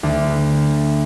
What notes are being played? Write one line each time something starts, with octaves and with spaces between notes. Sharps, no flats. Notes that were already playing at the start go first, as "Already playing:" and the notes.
D2